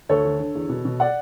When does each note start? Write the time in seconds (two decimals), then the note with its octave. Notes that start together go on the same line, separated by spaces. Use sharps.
0.09 D2 A4 C#5
0.25 D3
0.39 D3
0.55 E2
0.70 B2
0.85 B2
1.00 D5 F#5